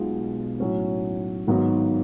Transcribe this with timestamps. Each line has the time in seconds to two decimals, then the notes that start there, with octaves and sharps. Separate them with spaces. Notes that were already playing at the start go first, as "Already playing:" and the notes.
Already playing: B1 B2 G#3 B3 F4
0.60 A2 F#3 C#4
1.47 G#1 G#2 F#3 B3 F#4